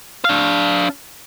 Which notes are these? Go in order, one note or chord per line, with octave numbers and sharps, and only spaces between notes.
D4 F5